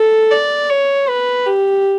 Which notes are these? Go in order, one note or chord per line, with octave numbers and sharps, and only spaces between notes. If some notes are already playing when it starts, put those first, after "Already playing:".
Already playing: A4
D5
C#5
B4
G4